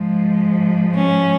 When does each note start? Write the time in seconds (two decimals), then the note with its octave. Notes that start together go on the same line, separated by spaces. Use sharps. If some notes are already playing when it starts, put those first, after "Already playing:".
Already playing: G#2 F3 G#3
0.95 C#4